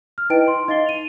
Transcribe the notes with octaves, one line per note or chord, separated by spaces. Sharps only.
F6
D#4 E4 B4 D#5 G5 D7
C6
D#4 D#5 F5 A6 C7 G7
D#7 F7